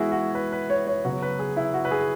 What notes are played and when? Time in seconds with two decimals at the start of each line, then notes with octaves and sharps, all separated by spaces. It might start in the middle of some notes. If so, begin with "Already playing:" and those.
Already playing: E3 G#3 B3 E4 F#4 G#4
0.12 F#4
0.35 B4
0.52 B4
0.70 C#5
0.87 C#5
1.05 C#3 F#3 B3 F#4
1.22 B4
1.39 G#4
1.57 E4
1.74 F#4
1.85 B4
1.91 G#4